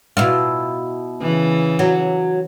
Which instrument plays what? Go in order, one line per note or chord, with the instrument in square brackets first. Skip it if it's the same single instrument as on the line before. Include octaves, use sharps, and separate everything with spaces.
[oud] B2 E4 F4
[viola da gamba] C#3 E3
[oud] F#3